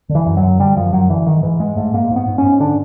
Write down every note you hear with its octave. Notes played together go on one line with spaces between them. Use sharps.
D3
E3
F#2
F#3
F#2
D3 G3
F#2 F3
F#2 F#3
D3 E3
G#2 D#3
G#2 E3
G#2 G#3
G#2 A3
G#2 A#3
G#2
B3
G#2
C#4
G#2
D3 D4